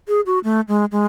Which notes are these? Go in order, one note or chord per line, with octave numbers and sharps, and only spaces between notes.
G#4
F#4
A3
G#3
G#3